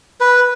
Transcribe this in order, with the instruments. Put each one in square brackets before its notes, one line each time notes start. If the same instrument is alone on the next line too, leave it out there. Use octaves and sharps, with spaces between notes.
[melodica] B4